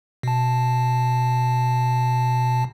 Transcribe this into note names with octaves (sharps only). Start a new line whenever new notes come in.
B2 A5